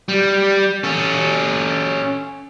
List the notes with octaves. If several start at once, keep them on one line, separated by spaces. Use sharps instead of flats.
G3
C#4 A4